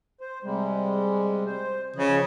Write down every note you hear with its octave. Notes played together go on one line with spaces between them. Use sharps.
C5
C3 G3 G#3
C5
C#3 F3 G#4 D#5